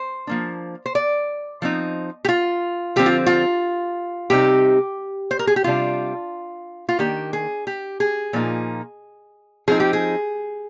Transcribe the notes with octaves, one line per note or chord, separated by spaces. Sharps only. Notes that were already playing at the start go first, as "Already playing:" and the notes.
Already playing: C5
F3 A#3 D4
C5
D5
F3 C4 D#4
G4
F4
D3 F3 C4 G4
F4
F4
C3 G3 C4 D#4 G4
C5
A#4
G#4
G4
C3 G3 D4 F4
F4
D#3 A#3 D4 G4
G#4
G4
G#4
A#2 F3 A#3 D#4
F3 C4 D#4 G#4
G4
G#4